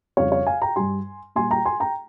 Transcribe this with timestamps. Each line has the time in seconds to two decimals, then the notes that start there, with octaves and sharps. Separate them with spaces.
0.17 F2 C#3 G3 C#5 F5
0.32 C#5 F5
0.47 F5 G#5
0.62 G5 A#5
0.76 G2 G3 G#5 C6
1.36 A#2 G3 G#5 C6
1.51 G5 A#5
1.65 G#5 C6
1.80 G5 A#5